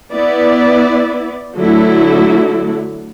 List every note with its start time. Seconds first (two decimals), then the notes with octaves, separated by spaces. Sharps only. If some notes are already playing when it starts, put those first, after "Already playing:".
0.13 B3 E4 D5
1.58 D3 F#3 A3 E4